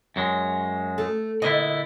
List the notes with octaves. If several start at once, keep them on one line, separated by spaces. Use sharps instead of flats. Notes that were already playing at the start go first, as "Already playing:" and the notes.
F#2 F#3 G#3
A3
A#2 D3 E4 D#5